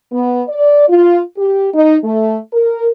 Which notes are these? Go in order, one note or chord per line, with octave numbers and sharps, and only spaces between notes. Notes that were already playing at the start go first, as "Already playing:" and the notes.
B3
D5
F4
G4
D#4
A3
A#4